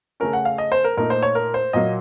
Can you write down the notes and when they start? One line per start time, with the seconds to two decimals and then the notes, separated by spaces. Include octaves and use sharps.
0.20 C#3 A3 C#4 A#4
0.33 F#5
0.45 F5
0.58 D#5
0.72 C5
0.84 A#4
0.97 A#2 A3 D#4 A#4
1.10 C5
1.23 C#5
1.35 A#4
1.54 C5
1.73 A#2 F#3 A#3 D#5